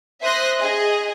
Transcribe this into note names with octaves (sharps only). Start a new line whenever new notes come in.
C5 E5 C6 D#6 F#6 A#6
G#4 D#5